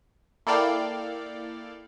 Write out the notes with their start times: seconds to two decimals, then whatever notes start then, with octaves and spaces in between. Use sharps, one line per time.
0.47 A#3 E4 A4 D5 F5 G5